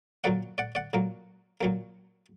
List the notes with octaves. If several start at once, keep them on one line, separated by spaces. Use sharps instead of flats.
A#2 F#3 A#3 D5 F#5
D5 F#5
D5 F#5
A#2 F#3 A#3
A#2 F#3 A#3